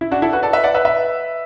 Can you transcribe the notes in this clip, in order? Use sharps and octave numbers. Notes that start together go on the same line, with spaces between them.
E4
D4 F#4
E4 A4
F#4 B4
A4 D5
B4 E5
D5 F#5
B4 E5
B4 E5